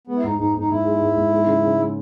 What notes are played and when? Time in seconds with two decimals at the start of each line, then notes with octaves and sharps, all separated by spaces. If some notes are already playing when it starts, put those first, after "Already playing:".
0.07 G#3 B3
0.16 E4
0.24 G#2 D#4
0.38 G#2 D#4
0.55 G#2 D#4
0.70 G#2 E4
0.85 G#3
1.01 G#2
1.16 G#2
1.32 G#3
1.47 C#3
1.63 C#3
1.78 G#3